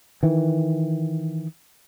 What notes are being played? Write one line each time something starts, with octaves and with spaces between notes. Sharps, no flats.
D#3 E3